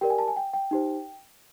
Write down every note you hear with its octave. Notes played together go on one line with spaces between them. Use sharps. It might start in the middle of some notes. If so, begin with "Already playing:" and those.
G4 A#4 D5 G5
G#5
A5
G#5
G5
G5
D#4 G4 C5